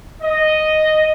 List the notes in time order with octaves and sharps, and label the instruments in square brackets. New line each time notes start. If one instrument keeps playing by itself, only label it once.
[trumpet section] D#5